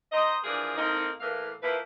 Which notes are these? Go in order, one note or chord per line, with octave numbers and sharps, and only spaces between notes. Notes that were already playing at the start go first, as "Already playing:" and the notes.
D#4 C5 D#5
E3 F3 D4 G#4 A#4
A2 A#3 C4 D#4
A2 E3 A#3 F5
F3 A#3 E4 B4